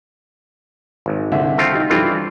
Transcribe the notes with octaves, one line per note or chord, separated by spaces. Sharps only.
G#1
C2 D3 E5
A3 C4 F4
D#4 G4
G2 E3 F3 C4 F4 A4